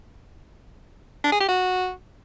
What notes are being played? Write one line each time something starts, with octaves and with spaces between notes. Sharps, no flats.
D4
G#4
G4
F#4